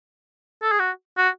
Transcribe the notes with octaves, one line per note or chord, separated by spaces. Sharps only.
A4
G#4
F#4
F#4